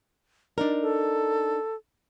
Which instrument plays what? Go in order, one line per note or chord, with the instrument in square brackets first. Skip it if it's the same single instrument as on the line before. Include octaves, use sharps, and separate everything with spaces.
[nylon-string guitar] D4 D#4 A#4 [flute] D5
[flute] A4